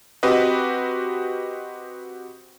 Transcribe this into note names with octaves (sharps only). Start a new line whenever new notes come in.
C4 F#4 G4 B4 D#5